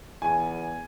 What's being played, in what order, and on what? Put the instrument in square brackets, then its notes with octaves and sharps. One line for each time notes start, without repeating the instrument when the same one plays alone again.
[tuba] E2 [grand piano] G#5